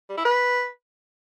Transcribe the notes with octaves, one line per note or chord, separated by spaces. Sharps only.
G3
E4
B4